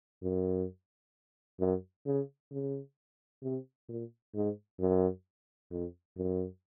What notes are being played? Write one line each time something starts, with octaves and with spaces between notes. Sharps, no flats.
F#2
F#2
C#3
C#3
C3
A#2
G#2
F#2
F2
F#2